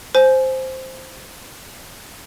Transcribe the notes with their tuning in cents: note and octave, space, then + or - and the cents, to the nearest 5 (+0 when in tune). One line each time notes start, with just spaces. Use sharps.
C5 +0 G#5 +20